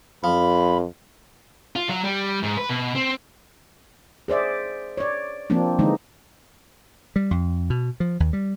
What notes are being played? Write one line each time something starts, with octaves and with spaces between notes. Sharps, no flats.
F2 F3 B5
F4
F#3
G3
G#2
B4
B2
C4
G#4 C5 D5 E5
C#5 D5
F3 A#3 C4 D4
D3 E3 G#3 D#4
G3
F2
B2
F3
D#2
G3